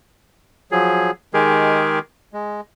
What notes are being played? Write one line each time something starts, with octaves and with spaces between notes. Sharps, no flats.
F3 F#3 G#4
D#3 G#3 G4 G#4 A#4
G#3